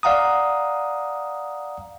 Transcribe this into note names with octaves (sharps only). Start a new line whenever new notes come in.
D5 F5 F#5 A#5 D#6